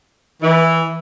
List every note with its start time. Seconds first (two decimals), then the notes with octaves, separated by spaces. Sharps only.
0.42 E3